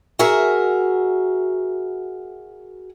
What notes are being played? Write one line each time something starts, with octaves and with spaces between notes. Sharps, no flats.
F#4 G#4 A#4 E5